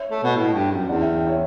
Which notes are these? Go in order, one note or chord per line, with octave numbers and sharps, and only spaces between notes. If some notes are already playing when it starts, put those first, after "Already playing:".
Already playing: C#5 E5
A3
B2
A2
G2
F#2
E2 D5 F#5
E5 G5
C#5 E5